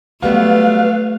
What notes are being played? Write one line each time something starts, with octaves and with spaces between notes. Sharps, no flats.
F#3 G3 A3 B3 B4 F5